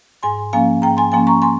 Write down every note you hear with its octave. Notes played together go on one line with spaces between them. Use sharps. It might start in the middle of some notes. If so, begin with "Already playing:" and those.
G#2 G#5 C6
F3 A#3 C#4 F5 G#5
G#2 G5 A#5
G#5 C6
F3 A#3 C#4 G#5 C6
A#5 C#6
G#5 C6